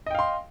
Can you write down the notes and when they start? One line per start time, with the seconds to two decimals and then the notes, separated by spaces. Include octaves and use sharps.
0.06 D#5
0.11 G5
0.15 F5
0.19 C6